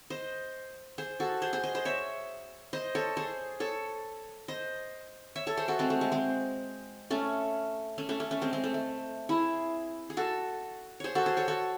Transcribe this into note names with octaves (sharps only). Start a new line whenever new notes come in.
C5 D#5
G#4 C5
F#4 A4
G#4 C5
G#4 C5
C5 D#5
C5 D#5
C#5 E5
C5 D#5
A4 C#5
G#4 C5
A4 C#5
C5 D#5
C#5 E5
A4 C#5
G#4 C5
F#4 A4
G#3 C4
A3
G#3
G#3 C4
A3 C#4
A3 C#4
A3 C#4
A3 C#4
A3 C#4
G#3 C4
G#3 C4
A3
A3
E4 G#4
G#4
F#4 A4
G#4 C5 C#5
F#4 A4
G#4 C5
A4 C#5
F#4 A4